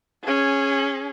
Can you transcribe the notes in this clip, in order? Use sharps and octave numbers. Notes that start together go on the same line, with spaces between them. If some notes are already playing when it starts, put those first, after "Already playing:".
C#4 G#4